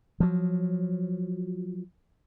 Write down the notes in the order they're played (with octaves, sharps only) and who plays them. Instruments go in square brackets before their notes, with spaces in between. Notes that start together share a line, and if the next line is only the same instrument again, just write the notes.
[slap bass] F3 F#3